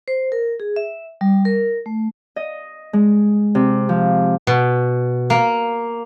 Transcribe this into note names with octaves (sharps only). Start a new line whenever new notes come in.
C5
A#4
G#4
E5
G3
A#4
A3
D#5
G#3
C3
F3
B2
A#3